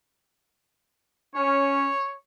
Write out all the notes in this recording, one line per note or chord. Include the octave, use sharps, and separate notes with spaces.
C#4 C#5